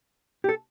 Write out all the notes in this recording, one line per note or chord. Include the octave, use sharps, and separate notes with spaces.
G4
A4